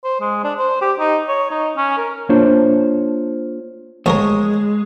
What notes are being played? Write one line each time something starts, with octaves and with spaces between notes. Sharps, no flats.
C5
G#3
D4
C5
G4
D#4
C#5
D#4
C#4
A#4
A#3 D4 F4 C5 C#5
A1 F3 G#3 A#4 C#5